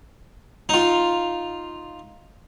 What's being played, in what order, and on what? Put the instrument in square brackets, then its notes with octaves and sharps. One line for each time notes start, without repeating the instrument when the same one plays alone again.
[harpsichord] D#4 F4